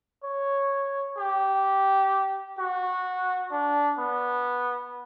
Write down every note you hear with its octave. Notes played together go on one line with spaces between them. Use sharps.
C#5
G4
F#4
D4
B3